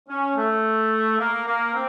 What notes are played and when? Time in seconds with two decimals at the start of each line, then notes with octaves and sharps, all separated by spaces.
0.09 C#4
0.36 A3
1.20 A#3
1.47 A#3
1.74 C4